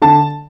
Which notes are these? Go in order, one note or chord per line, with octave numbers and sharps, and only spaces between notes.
D3 A5